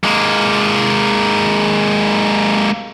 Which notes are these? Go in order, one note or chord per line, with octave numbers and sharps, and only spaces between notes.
G#3 A#3